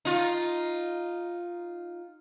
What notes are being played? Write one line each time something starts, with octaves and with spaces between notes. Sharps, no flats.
D#4 F4